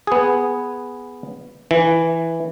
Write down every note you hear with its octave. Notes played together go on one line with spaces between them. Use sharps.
B3 G#4
E3